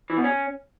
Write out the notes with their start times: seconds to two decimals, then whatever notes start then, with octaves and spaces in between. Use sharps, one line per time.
0.10 E3
0.17 B2
0.24 C#4